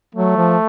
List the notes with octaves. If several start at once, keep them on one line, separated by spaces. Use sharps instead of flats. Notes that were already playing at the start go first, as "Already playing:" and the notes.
F#3 A3
F3